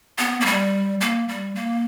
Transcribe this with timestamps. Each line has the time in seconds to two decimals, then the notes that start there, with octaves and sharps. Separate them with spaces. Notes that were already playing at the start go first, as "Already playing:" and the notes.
0.18 B3
0.41 A#3
0.46 G3
1.01 A#3
1.28 G3
1.55 A#3